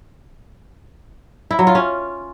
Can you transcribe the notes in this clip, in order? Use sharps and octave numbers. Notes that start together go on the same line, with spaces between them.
E4
F#3
F4
C#4